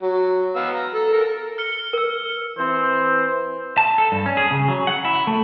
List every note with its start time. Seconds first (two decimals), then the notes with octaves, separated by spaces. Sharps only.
0.02 F#3
0.56 B3 F5 E6
0.75 A#5
0.94 A4
1.13 A4 A#4
1.58 F6 C#7 G7
1.93 A#4 E6
2.58 E3 C4 C5
3.78 A5
3.98 A4
4.12 G2
4.26 C#4
4.37 G#4
4.51 C#3
4.68 F#3
4.87 F#5
5.05 E4
5.27 A3